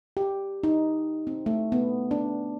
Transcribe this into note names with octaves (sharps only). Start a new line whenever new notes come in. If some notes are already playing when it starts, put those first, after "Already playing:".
G4
D#4
C4
A3
B3
D4